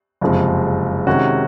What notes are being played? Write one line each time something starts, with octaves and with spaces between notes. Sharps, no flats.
F#1 F2 C3 F3 G#3
C3 D#3 G#3 C#4 F#4